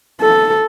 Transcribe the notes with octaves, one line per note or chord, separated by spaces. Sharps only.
A4